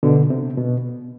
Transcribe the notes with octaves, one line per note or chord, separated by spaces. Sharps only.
B2 D3
C3
B2